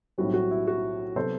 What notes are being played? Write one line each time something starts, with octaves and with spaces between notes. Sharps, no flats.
B1 A2 G3 C4 F#4
F#4
E4
F#4
C3 F#3 B3 A4 C5